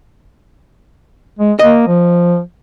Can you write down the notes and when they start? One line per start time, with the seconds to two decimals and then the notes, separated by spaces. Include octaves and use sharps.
1.39 G#3
1.59 A#3 D#5
1.87 F3